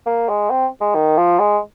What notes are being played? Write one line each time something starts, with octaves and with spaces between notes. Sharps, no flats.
A#3
G#3
C4
G#3
D#3
F3
G#3